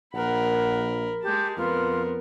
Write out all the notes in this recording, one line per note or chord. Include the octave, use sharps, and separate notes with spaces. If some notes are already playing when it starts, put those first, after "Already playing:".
A#1 A#4 F#5 B5
G#3 G4 A5
F2 B3 F4 A#4